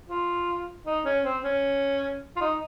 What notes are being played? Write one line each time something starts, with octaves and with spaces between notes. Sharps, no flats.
F4
D#4
C#4
C4
C#4
F4
D#4